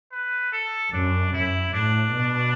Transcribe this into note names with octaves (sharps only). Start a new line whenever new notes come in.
B4
A4
F#2 D4
F#2 E4
A2 D4
B2